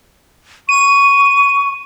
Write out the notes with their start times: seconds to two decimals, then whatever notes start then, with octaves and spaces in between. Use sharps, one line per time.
0.69 C#6 D#7